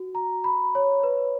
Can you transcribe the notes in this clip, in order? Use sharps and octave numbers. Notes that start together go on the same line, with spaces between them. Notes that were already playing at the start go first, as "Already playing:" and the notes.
Already playing: F#4
A#5
B5
C#5
B4